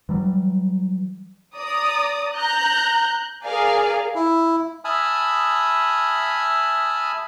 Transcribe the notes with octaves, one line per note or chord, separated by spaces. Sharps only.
E3 F#3 G3
D5 A#5 D#6
A#5 F#6 G6
G#4 A#4 D5 F5 G#5
E4
E5 G#5 A5 B5 D#6 F6